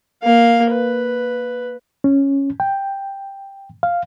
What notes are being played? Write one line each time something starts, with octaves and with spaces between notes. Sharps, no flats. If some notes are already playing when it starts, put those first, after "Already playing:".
A#3 F5
B4
C#4
G5
F5